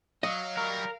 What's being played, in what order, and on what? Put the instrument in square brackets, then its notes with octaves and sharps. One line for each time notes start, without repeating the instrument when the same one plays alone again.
[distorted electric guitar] F#3 [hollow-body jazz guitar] D#5 [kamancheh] F5
[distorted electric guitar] F#3 G3 [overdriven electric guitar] A#4